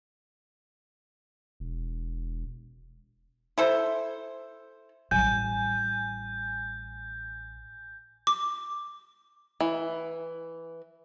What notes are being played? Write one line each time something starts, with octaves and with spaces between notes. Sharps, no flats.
E1
E4 A4 C5
A1 G3 G#5 G6
D6
E3